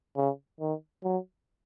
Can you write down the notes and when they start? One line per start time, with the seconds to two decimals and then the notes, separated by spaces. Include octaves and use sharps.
0.16 C#3
0.60 D#3
1.04 F#3